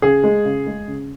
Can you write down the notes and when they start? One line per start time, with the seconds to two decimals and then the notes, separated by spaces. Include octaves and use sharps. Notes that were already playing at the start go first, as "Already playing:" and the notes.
0.02 C#3 G#4
0.24 G#3
0.45 C#3
0.67 G#3
0.88 C#3